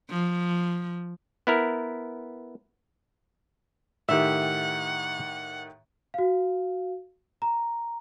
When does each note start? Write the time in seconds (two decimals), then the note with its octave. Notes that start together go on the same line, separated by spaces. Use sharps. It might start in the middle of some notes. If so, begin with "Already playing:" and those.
0.10 F3
1.47 B3 E4 A#4
4.09 A2 D#3 G4 E5 F#5
6.14 F#4 F5
7.42 A#5